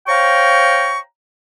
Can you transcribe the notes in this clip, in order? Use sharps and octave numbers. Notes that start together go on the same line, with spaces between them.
C5 C#5 F5 G5 A#5 C#6